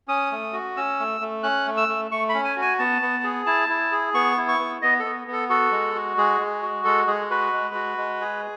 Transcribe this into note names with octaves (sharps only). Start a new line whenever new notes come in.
C#4 D#6
A3
F#4
C#4 E6
A3
A3
C#4 F#6
A3
E6
A3
A3 C#6
B5
C#4
G#5
F#4
G#5
B3 A5
B3
G#4
E4 A5
E4
G#4
B3 C#6
E4
C#6
B3
B3 D#5
A4
B3
B3 A4
F#4 A4
G#3
F#4
G#3 G#4
G#3
F#4
G#3 A4
G#3 G#4
F#4 B4
G#3
F#4
G#3
G#4